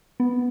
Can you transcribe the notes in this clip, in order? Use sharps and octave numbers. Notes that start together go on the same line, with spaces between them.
B3